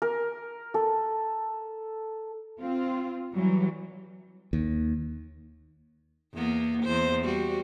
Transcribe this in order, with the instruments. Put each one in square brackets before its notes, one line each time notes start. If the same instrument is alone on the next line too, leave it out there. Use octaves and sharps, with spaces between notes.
[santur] A#4
A4
[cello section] C4 F4
E3 F#3 G3
[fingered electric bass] D#2
[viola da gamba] E2 A#3 B3
E2 C5
G3 F#4